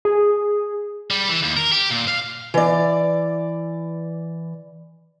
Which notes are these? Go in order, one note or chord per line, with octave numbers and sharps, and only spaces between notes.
G#4
G3
E3
D#2
A#4
G4
A#2
F5
E3 D5